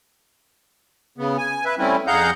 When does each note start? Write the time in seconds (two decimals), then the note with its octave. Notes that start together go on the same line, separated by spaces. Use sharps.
1.18 C#3 B3
1.38 G#5
1.65 B4 E5
1.78 G3 A3 C4 C#4 E4
2.07 F2 G#4 F5 F#5 A#5 G6